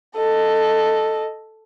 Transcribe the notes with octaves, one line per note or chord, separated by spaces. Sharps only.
A4 D#5